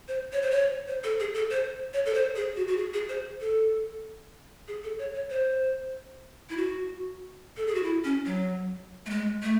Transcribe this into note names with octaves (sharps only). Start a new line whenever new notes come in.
C5
C#5
C5
C#5
C5
A4
G#4
A4
C5
C#5
A4
C5
G#4
F#4
F#4
G#4
G#4
C5
A4
G#4
A4
C#5
C#5
C5
E4
F#4
A4
G#4
F#4
E4
C#4
F#3
A3
G#3
A3